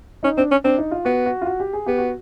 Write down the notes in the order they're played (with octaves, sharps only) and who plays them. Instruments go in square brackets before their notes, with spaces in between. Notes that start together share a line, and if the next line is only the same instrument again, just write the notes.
[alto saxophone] C#4 [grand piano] D#4
[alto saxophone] C4 [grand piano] D4
[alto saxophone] C#4
[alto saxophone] C4 [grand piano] D4
[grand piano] D#4
F4
[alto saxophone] B3 [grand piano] F#4
[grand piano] F#4
F4
F#4
G4
G#4
[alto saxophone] B3 [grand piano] G4
[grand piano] F#4